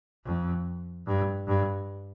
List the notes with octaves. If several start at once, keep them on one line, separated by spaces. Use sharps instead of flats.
F2
G2
G2